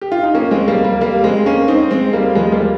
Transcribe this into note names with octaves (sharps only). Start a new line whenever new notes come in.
G4
F4
D#4
A#3 C#4
G#3 C4
G3 A#3
G3 A#3
G3 A#3
G#3 C4
A#3 C#4
C4 D#4
G#3 C4
G3 A#3
F3 G#3
G#3
G3 A#3